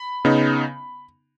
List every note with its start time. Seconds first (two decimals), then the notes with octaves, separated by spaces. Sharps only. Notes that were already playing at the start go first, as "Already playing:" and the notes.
Already playing: B5
0.25 C#3 B3 D#4